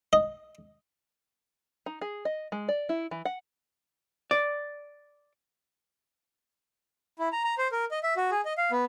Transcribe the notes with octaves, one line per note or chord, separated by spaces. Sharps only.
D#5
D#4
G#4
D#5
G#3
D5
E4
E3
F#5
D5
E4
A#5
A#5
C5
A#4
D#5
E5
F#4
G#4
D#5
F5
B3